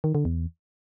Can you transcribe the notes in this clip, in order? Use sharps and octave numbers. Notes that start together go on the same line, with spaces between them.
D#3
D3
E2